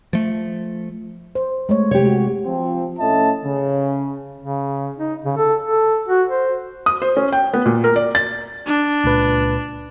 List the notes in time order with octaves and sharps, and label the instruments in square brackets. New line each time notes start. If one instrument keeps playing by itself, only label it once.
[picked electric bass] F3 A3
[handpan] C5
G#3 A3 C#5
[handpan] C3 [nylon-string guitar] G4 C#5
[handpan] G#3 F#4
[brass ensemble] F3 C4
A2 A3 C#4 D#5 E5 A5
C#3
[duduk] C#3
D#4
C#3
A4
A4
F#4
C5
[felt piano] D#6
C5
C#4
G5
B3
A#2
A#4
D5
A6
[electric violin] D4
[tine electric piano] C#2 A#2 B4